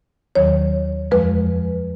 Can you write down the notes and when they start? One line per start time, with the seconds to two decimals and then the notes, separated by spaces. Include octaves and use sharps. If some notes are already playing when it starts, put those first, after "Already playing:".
0.35 D#2 D#3 F#3 C#5
1.11 F2 F3 G#3 B4